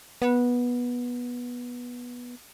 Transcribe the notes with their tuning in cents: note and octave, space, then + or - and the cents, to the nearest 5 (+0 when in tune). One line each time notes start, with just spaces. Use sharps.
B3 -15